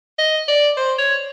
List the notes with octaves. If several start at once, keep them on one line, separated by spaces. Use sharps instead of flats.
D#5
D5
C5
C#5